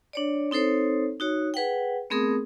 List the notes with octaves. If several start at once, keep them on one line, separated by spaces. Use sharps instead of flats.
D4 C#5 D5
C4 D#4 A4 C5 C#5
D#4 F#4 C#5
G#4 B4 F#5 G5
A3 B3 C4 G#4 A#4 D#6